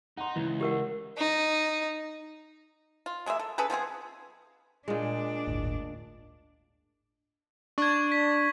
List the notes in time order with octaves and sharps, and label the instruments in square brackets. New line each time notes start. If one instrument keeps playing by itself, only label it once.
[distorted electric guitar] D#4 [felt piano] F#5 A#5 C6
[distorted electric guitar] C#2 [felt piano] E3
[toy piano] G4 A#4 F#5
[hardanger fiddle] D#4
[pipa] F4
F#3 G#3 A#3 E5
A4
C#4 G#4 A4 B4
F3 B3 C4 G#4
[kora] A#2 G#3 [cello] D4
[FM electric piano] G1 D2 A2
[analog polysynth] D4 [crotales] C#6 G#6
[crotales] B6